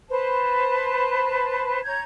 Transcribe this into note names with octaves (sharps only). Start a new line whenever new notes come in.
B4 C5 A5
C#5 A#5 G6 G#6